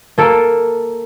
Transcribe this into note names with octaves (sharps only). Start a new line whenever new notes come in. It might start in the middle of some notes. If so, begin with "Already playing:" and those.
A#3 A4 D7